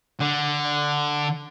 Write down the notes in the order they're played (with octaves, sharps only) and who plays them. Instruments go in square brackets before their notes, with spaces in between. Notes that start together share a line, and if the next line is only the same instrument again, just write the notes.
[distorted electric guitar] D3